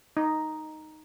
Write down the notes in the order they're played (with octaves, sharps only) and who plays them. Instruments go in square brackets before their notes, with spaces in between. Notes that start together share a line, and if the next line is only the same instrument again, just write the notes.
[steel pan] D#4